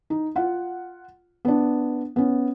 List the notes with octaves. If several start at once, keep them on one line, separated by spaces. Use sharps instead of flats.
D#4
F4 F#5
B3 D4
B3 C#4